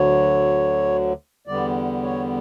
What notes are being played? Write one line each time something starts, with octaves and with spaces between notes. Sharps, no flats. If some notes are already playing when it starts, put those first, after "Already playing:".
Already playing: D2 D3 F#3 C#5
E2 D3 G3 B3 D5
C#5